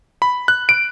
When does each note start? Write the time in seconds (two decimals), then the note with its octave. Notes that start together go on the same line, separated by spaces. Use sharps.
0.22 B5
0.48 F#6
0.69 D7